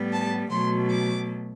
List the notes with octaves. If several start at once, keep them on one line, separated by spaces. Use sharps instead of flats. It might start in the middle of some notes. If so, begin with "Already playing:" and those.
Already playing: A2 G3 B3
A5
B2 F#3 A3 C6
D6